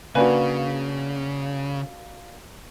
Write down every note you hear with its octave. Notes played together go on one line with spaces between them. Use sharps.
C#3 A#3 D4 F#4 B4 G#5 B5